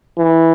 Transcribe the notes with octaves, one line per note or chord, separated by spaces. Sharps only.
E3